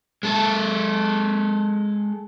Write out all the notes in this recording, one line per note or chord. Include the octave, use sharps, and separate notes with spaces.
G#3 A4